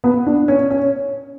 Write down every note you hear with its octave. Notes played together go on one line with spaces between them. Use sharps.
B3
D4
C#4
C#4